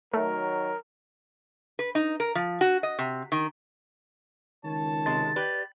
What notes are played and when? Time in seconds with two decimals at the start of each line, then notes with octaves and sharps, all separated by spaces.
0.13 D#3 F#3 A3 A#4
1.79 B4
1.95 D#4
2.20 A#4
2.35 F3
2.61 F#4
2.83 D#5
2.99 C3
3.32 D#3
4.65 C#2 D#3 C#5 A5
5.06 C3 G#3 A6
5.36 G4 B4 D5